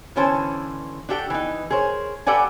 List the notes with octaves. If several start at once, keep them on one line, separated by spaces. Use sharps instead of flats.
D3 E3 C#4 C5 A5
D4 F#4 G4 A4 G5
E3 D#4
G#4 A#4 C5 C#5
G4 A4 B4 D5 F#5 G#5